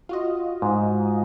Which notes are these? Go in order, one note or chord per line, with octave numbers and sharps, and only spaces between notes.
F4 F#4 D#5
G#2